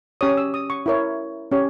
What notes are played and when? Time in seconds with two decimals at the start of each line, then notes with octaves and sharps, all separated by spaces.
0.21 C#4 G4 C#5 D#6
0.37 E6
0.54 D#6
0.70 C#6
0.86 E4 A#4 C#5
1.52 C#4 G4 C#5